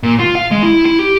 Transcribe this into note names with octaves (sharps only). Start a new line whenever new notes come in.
A#2
F4
F5
G#3
E4
E4
G4